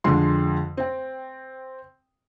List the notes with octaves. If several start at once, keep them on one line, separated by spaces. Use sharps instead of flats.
F2 D3 G#3 C6
C4 G5